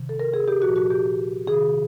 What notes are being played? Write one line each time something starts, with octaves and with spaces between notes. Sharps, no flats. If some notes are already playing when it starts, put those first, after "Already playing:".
Already playing: C3 D#3
A4
A#4
G#4
G4
A#2 F3 F#4
F#4
G4
C3 D#3 G#4